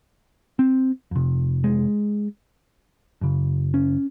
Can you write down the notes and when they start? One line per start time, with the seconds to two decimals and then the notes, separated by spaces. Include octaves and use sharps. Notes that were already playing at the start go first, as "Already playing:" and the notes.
0.59 C4
1.11 F2 C3
1.64 G#3
3.21 F#2 C#3
3.74 C#4